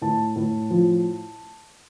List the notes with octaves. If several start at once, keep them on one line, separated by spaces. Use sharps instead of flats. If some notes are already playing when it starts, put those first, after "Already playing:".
A2 A5
A2
F3